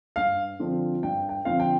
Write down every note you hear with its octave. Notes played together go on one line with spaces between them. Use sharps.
G2 F5
D3 F3 C4
G2 G5
G5
D3 F3 C4 F5
G5